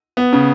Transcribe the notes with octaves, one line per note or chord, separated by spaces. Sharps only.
B3
C#3